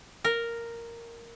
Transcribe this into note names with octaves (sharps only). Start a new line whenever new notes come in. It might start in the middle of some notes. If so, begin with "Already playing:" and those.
A#4